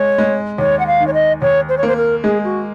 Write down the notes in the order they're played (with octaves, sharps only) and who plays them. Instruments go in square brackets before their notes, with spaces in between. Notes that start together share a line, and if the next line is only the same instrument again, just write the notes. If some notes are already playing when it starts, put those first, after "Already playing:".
Already playing: [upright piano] G#3 [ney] C#5
[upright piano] G#3
[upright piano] D#2 [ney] C#5
[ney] F#5
F5
[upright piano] D#3
[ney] C#5
D#5
[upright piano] D#2 [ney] C#5
[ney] C5
C#5
[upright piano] A#3 [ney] C5
[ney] A#4
[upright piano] G#3 [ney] G#4
[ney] F#4